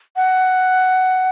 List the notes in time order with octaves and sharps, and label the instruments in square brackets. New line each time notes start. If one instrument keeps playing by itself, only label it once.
[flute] F#5